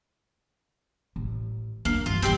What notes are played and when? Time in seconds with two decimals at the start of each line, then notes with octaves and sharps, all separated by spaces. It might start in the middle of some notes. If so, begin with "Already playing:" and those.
1.16 A1
1.85 E2 A#3 D4
2.06 G2 E3 F4
2.22 D#1 E3 C4 G4 D5